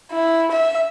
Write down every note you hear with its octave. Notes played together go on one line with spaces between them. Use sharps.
E4
E5